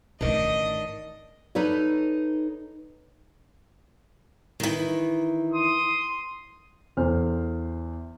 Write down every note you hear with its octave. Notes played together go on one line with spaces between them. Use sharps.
A1 A2 D#3 D4 D#5
D#4 A4 B4 C#5 D5
D#3 E3
C6 D#6
E2 A4 C5 F6